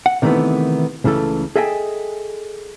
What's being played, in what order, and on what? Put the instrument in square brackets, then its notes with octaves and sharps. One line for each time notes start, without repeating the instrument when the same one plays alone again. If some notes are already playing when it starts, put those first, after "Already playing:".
[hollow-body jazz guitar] F#5
C3 D#3 E3 G#3 A3 B3
C#2 C#3 E3 A3 A4
G#4 A4 D#5 E5 G5 G#5